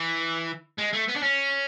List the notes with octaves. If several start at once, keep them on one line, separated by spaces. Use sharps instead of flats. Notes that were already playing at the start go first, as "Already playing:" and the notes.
Already playing: E3
G#3
A3
B3
D4
C#4